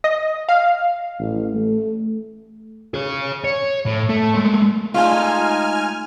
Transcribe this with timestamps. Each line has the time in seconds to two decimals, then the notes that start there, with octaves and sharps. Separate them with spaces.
0.04 D#5
0.49 F5
1.20 A1
1.55 A3
2.94 G#4 C#5
3.44 C#5
3.86 A2
4.09 A3
4.34 G#3 A3
4.94 G#3 A3 D#4 F4 C5 G#5 F6